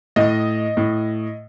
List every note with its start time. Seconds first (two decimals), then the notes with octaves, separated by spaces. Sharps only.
0.16 A2 D#5
0.77 A2